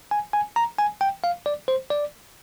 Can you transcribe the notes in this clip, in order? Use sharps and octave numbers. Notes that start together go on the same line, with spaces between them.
G#5
G#5
A#5
G#5
G5
F5
D5
C5
D5